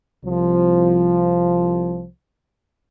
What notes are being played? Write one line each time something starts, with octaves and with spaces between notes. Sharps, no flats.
C2 F3